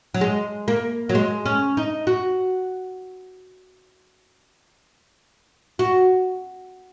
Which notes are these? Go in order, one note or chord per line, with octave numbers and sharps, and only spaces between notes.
F#3
G#3
A#3
F#3
G#3
C#4
D#4
F#4
F#4